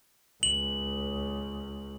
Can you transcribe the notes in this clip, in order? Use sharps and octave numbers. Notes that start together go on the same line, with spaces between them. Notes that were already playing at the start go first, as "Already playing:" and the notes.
C#2 F#7